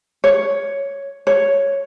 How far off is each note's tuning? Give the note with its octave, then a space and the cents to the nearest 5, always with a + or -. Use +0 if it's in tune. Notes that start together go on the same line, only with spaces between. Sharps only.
C#5 +5
C#5 +0